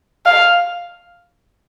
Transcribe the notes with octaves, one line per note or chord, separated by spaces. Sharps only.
F5